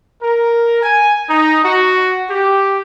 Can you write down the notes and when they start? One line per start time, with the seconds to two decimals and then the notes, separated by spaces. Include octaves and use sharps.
0.22 A#4
0.82 G#5
1.29 D#4
1.64 F#4
2.30 G4